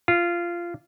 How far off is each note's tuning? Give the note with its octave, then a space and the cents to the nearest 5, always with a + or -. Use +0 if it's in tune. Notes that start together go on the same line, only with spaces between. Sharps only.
F4 -15